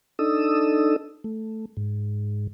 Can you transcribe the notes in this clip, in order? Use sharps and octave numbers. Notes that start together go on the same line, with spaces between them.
D4 D#4 A4 D#6 E6
A3
G#2